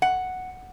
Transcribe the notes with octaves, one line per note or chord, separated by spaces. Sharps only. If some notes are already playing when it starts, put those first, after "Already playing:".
F#5